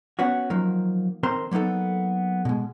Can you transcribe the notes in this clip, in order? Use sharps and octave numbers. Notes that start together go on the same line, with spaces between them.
B3 C#4 F#4
D#3 F3 F#3 A#3
D#3 C4 A#4 C5 A#5 C6
F#3 A#3 B3 D#4 A4
B2 G#3